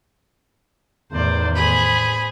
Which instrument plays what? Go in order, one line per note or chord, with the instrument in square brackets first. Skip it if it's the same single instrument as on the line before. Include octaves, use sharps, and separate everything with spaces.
[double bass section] E2 A2 D#3 [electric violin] C5 D5
[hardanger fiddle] G#4 C5 [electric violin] G#5 B5